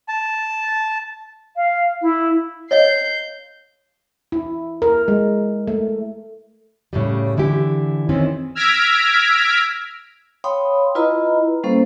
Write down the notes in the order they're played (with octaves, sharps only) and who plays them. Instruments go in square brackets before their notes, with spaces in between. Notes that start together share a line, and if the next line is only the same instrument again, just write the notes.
[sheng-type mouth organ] A5
[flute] F5
E4
[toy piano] C#5 D#5 F5 [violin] G6 C7
[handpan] E4
A#4
G#3
A3
[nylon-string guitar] A2 C#3 G3
D3 E3 E4 G4
D#3 E3 C4 C#4
[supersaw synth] E6 F6 G#6 A#6 B6 D7
[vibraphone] C#5 F5 G5 B5 C6 D#6
E4 F4 B4 D#5 A#5 B5
G3 A#3 C#4 A4 C5 F5